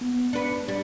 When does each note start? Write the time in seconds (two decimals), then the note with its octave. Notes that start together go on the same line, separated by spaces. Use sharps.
0.01 B3
0.33 D4 B4 C#7
0.68 G3